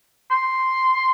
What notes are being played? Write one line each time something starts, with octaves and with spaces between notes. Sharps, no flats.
C6